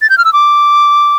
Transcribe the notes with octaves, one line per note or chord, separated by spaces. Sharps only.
A6
G6
F6
E6
D6